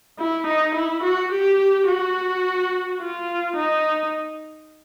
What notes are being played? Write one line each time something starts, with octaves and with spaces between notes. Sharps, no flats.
E4
D#4
E4
F#4
G4
F#4
F4
D#4